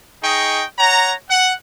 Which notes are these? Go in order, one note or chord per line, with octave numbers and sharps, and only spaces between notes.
D#4 G#4 D#5 G5 C#6
C#5 F#5 A#5
F#5